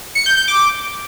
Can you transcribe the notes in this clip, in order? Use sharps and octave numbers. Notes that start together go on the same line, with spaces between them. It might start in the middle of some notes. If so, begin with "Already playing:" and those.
C#7
G6
G6
D6